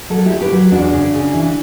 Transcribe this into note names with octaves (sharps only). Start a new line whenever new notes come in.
F#3 F#4 A4
E4 G4
D2
G4 B4
F#3
E2 D4 F#4
C#3
C#3
E3